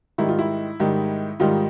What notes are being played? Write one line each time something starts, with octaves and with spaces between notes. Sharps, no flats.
G#2 D#3 G3 E4
F4
E4
G#2 D#3 G3
G#2 D#3 G3 F4